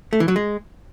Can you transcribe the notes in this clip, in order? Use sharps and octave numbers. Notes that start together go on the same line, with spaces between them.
A3
E3
F#3
G#3